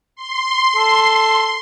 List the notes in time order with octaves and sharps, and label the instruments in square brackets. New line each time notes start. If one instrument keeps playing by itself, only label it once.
[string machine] C6
[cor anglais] A4